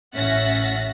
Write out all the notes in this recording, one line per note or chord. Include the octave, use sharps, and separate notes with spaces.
A1 C#4 E5 F#5 A6 A#6